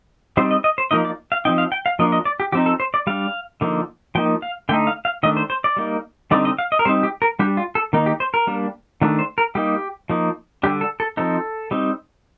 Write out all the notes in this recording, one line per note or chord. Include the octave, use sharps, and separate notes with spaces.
G3 C4 D#4 C5
D#5
D#5
C5
F3 A#3 D#4 D#5
D5
F5
F3 C4 D#4 G5
F5
G5
F5
F3 A#3 D4 D#5
D#5
D5
G4
F3 C4 D#4 G4
A4
C5
D5
G3 D4 F5
D3 F3 A#3 D#4
F3 A#3 D#4 G5
F5
D3 A3 D#4 G5
F5
F5
D#3 A3 D4 D#5
C5
C5
D5
G3 A#3 D#4
D3 G3 C4 D#4 D5
D#5
F5
D#5
A#4
G3 C4 D#4 C5
G4
A#4
G3 D4 G4
F4
A4
D#3 A#3 D#4
G4
C5
A#4
G3 A#3 D4
D#3 A3 D4
C5
A#4
G3 A#3 D#4 G4
F3 A#3 D#4
D3 G3 D4 G4
A4
A4
F3 C4 D#4 A4
G3 C4 D#4